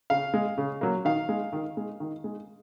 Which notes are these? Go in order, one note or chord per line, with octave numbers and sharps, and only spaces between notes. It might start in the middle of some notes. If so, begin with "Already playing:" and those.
C#3 F5
G#3
C#3
F#3 A#3
D#3 F5
G#3
D#3
G#3
D#3
G#3